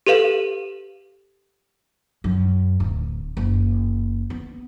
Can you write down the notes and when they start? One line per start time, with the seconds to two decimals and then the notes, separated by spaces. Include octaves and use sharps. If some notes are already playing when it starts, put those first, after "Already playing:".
0.07 G4 A4 B4 F5 E7
2.24 F#2
2.80 D1
3.37 F#1
4.30 B3